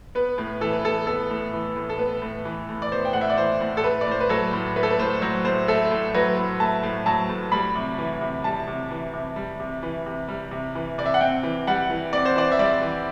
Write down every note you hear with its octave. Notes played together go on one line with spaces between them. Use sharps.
B3 B4
A2
E3 A4
B4
A2 A4
B3 A4
A2
E3
A2
A4
B3 B4
A2
E3
A2
D5
B3 C5
G5
A2 F#5
E5
D5
E3 C5
A2
A4
A3 B4
D5
A2 C5
B4
F#3 A4
A2
A3 B4
A4
B4
A2 C5
F#3 C5
A2 C5
A3 A4
A2
F#3 B4
A2
A3 A5
A2
F#3 A5
A2
G3 B5
C3
E3
C3
G3 A5
C3
E3
C3
G3
C3
E3
C3
G3
C3
E3
C3 D5
E5
F#5
C4 G5
E3
G3 F#5
E3
C4 D5
C5
E3 D5
E5
G3 D5
E3